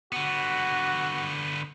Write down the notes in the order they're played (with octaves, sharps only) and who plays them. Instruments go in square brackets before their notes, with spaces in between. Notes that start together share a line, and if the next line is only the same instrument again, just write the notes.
[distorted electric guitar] D3 B3 [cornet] F#4